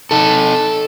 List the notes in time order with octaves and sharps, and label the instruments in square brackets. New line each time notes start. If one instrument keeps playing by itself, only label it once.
[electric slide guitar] D#4 A4